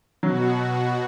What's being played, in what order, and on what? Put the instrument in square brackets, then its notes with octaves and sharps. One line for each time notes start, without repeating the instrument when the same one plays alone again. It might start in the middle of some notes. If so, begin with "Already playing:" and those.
[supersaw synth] B2 F#4 [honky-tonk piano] F#3